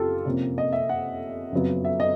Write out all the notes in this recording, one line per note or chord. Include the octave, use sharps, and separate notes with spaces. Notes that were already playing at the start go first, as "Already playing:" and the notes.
Already playing: F#1 F4 G4 A4
F2 C3 F3 A#3 C#4
D#5
E5
F#5
F#1 F2 C#3 F#3 B3
E5
D#5